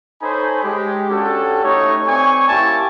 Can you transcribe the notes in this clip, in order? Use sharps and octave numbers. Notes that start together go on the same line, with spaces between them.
D#4 A4 C5 C#5 G#5 B5
G#3 G4
C#4 D4 F#4 G4 A4
A3 D#4 C#5
C4 D5 G#5 C#6
A#3 C#4 E4 G4 G#5 A5